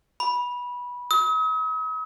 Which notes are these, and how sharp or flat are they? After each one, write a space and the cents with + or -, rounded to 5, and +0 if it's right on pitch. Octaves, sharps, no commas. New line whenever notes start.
B5 -15
D#6 +45